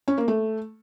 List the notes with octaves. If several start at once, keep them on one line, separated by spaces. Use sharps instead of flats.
C#4
A#3
A3